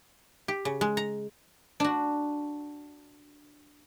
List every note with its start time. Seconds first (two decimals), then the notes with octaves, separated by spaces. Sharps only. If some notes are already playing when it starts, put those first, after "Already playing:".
0.48 G4
0.65 C#3
0.81 G#3
0.97 A#5
1.80 D4 F#4